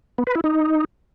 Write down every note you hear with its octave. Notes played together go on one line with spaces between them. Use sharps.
B3
B4
E4
D#4